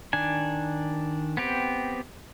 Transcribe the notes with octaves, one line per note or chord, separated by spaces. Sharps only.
D#3 D4 G#5
B3 C4 G4